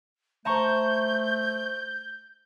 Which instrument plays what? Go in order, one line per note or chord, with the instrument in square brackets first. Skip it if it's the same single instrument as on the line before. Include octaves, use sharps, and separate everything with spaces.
[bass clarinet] A3 [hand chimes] C5 E5 [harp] A5 A#5 C#6 [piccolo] G6